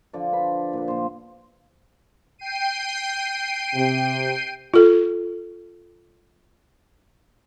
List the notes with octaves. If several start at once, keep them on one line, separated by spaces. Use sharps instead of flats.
D3 F3 A4 D5
B4 C5 B5
A#2 B4
A#2 C5
G5 C7 D#7
C3
F4 A4